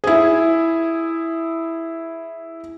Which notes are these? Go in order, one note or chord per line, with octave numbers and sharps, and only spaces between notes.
E4 G#4